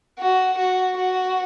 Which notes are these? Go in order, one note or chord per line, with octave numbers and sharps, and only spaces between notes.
F#4
F#4
F#4